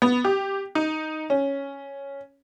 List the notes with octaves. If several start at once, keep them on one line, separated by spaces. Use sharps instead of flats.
B3
G4
D#4
C#4